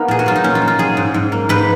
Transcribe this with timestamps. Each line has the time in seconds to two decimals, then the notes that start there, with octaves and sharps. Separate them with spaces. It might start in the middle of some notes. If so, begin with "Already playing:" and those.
Already playing: A#3 B3 D#4
0.08 A#2 G#4
0.19 F#4
0.26 F#3 F4
0.35 D#4
0.44 A#2 C#4
0.55 F4
0.62 A#2
0.68 F4
0.79 F#3 G#4
0.97 G#2
1.14 G#2
1.32 A#3
1.49 G#2 B4